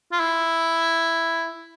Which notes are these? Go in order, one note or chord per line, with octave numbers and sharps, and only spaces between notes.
F4
E4